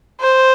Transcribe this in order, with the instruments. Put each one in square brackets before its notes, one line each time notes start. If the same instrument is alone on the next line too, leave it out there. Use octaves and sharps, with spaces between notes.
[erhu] C5